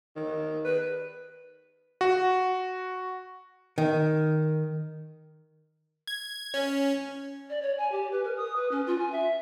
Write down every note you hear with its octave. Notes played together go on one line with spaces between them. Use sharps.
D#3
B4
F#4
D#3
G#6
C#4
D5
C#5
G#5
G4
B4
A#4
D#6
B4
C#4
F4
G#5
E5